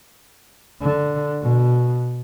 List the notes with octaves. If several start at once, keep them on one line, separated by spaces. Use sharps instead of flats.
D3
B2